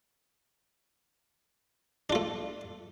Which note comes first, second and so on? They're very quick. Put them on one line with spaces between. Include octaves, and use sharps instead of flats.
D4 F4 A3